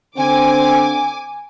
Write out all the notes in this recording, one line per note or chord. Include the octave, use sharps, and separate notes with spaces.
D3 C4 G#5 D6